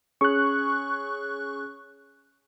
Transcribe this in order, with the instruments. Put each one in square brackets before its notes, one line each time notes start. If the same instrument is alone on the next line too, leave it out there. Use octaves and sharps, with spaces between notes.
[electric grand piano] C#4 G#4 [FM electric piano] C#6 F#6